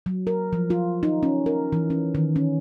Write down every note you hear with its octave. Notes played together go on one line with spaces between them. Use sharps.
F#3
A#4
F3
F4
D#4
C#4
A#4
E3
C#4
D#3
C#4